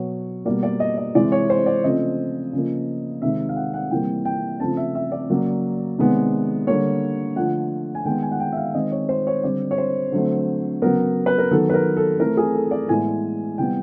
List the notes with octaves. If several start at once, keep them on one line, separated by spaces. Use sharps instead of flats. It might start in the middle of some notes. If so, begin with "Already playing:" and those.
Already playing: B2 F#3 B3 C#5
B2 G3 A#3 D5
D5
D#5
D#5
C3 E3 G#3 D5
C#5
C5
D5
C#3 F3 A3 C4 D#5
C#3 F3 A#3
C3 D#3 G#3 E5
F5
F#5
F#5
C3 E3 G3 A#3 G5
G5
C#3 F3 A3 C4 A5
E5
E5
D5
C#3 F#3 A#3
C3 D#3 G#3 B3
D3 G3 A#3 C#5
D3 F3 A3 F#5
G#5
D#3 G#3 B3 G5
G#5
F#5
G5
E5
F5
D#3 G#3 C4 D#5
C#5
C5
C#5
D3 G3 C4 D5
C#5
C5
D3 F#3 A3 C4
C#3 F#3 B3 A#4
B4
A#4
D#3 F#3 B3 A4
B4
A#4
A4
E3 A3 C4 A#4
G#4
A4
D5
A2 E3 G#3 B3 G#5
C3 E3 G3 B3 G5